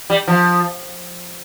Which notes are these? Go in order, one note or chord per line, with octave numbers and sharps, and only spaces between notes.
G3
F3